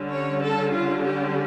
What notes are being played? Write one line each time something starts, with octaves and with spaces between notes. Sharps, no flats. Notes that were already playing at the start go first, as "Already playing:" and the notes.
Already playing: D3 G3 C#4
C#5
A4
F4
G4